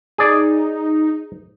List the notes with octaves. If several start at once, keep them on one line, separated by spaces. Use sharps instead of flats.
D#4 G#4 D5